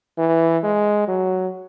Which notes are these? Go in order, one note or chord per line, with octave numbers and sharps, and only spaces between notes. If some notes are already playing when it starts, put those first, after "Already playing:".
E3
G#3
F#3